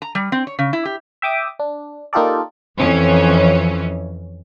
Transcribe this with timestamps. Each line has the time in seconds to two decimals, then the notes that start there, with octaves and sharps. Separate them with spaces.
0.02 A#5
0.15 G3
0.32 C4
0.47 C#5
0.59 C#3
0.73 E4
0.85 G4
1.22 E5 G5 D6 D#6
1.59 D4
2.13 A#3 D#4 F4 G4 A4 D5
2.77 F2 E3 C#4